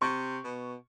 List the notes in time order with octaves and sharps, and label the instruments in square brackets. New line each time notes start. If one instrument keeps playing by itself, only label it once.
[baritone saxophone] C3 [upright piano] C#6
[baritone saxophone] B2